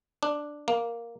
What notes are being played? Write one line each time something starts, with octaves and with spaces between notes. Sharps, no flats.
D4
A#3